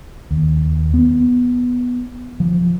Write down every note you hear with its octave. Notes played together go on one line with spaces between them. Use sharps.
D#2
B3
F3